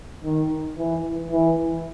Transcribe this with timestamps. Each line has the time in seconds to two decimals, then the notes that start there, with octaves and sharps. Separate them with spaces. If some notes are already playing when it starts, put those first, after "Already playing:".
0.24 D#3
0.78 E3
1.32 E3